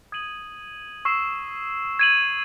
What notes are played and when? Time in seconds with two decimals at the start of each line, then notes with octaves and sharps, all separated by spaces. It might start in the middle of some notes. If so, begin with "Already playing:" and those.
0.12 D#6 G#6 D#7 F#7
1.05 C#6 E6 C7 E7
1.99 G#6 D#7 F#7